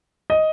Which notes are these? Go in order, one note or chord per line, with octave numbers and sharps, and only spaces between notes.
D#5